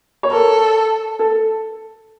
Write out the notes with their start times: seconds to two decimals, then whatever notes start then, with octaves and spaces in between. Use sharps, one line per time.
0.23 C#5
0.31 A4 A#4
1.19 A4